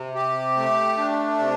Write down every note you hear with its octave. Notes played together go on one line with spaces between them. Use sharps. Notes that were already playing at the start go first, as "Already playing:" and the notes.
Already playing: C3
G4
A3
D4
C3